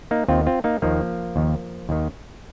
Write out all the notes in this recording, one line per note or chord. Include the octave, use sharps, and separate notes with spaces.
A#3 D#4
D#2 D#3 C4 F4
C4 F4
A#3 D#4
D#2 D#3 F3 A#3
D#2 D#3
D#2 D#3